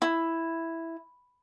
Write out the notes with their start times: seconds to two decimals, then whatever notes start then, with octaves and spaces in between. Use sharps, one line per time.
0.02 E4